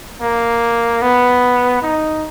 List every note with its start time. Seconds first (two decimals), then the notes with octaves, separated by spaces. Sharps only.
0.21 A#3
1.02 B3
1.82 D#4